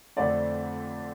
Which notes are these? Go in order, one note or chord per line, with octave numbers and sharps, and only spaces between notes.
F2 D3 A3 C4 D5